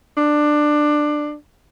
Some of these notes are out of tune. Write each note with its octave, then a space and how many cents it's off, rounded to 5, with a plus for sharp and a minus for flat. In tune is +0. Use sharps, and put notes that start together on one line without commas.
D4 +15